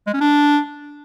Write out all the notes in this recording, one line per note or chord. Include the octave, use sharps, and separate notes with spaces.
G#3
C#4
D4